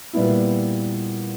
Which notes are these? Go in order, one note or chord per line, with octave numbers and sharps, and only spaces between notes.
A#2 G3 B3 E4